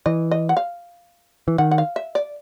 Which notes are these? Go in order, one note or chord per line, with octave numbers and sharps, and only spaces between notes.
E3 D#5
D#5
F#5
F5
E3
D#3 F#5
F#5
F5
E5
D5